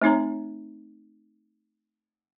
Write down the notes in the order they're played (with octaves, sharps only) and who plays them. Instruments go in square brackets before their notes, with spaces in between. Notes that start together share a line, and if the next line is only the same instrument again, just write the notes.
[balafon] A3 C4 D#4 C#5 A#5